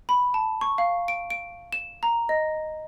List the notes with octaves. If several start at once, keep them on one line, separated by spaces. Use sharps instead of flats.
B5
A5
C#6
F5
D7
D7
E7
A#5
D#5